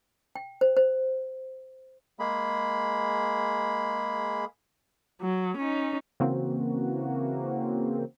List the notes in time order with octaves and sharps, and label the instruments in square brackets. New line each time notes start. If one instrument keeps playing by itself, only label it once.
[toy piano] G5
C5
C5
[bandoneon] G#3 A#3 G#4 B5
[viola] F#3
C#4 D#4
[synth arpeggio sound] C#3 E3 A#3 C4 F#4